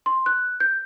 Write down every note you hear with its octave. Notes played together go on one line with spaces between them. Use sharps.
C6
F#6
G6